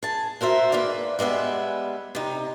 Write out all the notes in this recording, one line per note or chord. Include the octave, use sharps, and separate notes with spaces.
G#4 A5
F#4 A#4 C5 E5
G#2 A#3 B4 D5
G3 G#3 B3 E5
C3 D#4